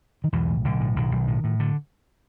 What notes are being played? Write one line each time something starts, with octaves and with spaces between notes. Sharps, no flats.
D#3
B1 E2 E3
A2
B1 D3
A2
B1 D#3
B1
A2
A2
D3